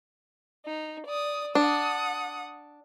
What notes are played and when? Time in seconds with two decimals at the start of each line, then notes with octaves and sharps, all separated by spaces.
0.66 D#4
1.07 D5 D#6
1.55 D4 F#5 D#6